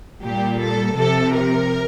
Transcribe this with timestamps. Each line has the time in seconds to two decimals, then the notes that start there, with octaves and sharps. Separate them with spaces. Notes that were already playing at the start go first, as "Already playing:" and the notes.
0.22 A#2 G3 G4
0.60 A4
0.96 C3 F3 A4
1.33 A#4